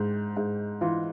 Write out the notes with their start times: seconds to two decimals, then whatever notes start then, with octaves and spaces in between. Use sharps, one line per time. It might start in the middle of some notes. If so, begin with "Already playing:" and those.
Already playing: G#2
0.37 G#2
0.81 E3 F4